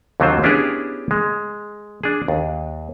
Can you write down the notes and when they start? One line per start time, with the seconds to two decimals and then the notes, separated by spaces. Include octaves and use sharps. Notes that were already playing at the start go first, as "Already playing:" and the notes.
0.20 D#2 D3 F#3 C4 F4 C5
0.43 B3 C#4 D4 E4 G4 G#4
1.11 G#3
2.04 D4 G#4
2.28 D#2